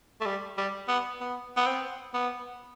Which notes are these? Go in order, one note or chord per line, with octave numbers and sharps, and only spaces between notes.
A3
G3
G3
B3
B3
B3
C4
B3